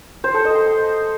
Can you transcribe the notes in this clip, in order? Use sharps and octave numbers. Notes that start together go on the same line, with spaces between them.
C5
A4
D#5
C6